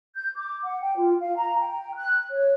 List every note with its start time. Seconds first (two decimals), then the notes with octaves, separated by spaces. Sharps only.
0.16 G6
0.36 D6
0.64 F#5
0.81 G5
0.97 F4
1.20 F5
1.36 A#5
1.59 G5
1.95 F#6
2.31 C#5